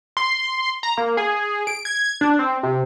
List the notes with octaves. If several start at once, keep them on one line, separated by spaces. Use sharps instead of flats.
C6
A#5
A#3
G#4
D7
G#6
D4
C4
C3